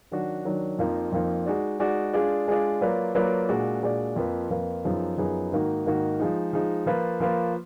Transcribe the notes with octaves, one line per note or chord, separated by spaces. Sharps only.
D#3 F#3 D4 F#4
D#3 F#3 D4 F#4
F2 F3 A#3 D#4
F2 F3 A#3 D#4
G#3 D#4 F#4 D5
G#3 D#4 F#4 D5
G#3 D4 F4 G#4 D5
G#3 D4 F4 G#4 D5
F#3 A#3 F4 B4 D5
F#3 A#3 F4 B4 D5
A#2 G#3 D4 F#4 D5
A#2 G#3 D4 F#4 D5
F2 F3 A#3 F4 B4
F2 F3 A#3 F4 B4
F#2 F3 B3 D#4 G#4
F#2 F3 B3 D#4 G#4
G#2 D#3 A#3 D#4 F#4
G#2 D#3 A#3 D#4 F#4
F3 G#3 D#4
F3 G#3 D#4
F3 A#3 F4 B4
F3 A#3 F4 B4